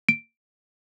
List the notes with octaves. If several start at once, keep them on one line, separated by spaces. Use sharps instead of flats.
D7